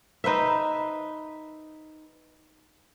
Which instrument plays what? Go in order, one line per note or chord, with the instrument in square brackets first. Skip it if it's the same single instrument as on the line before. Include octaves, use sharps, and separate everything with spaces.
[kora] D#4 B4 C5 E5